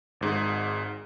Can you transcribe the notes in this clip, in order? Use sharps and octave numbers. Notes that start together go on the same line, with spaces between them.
G#1 G#2 G#4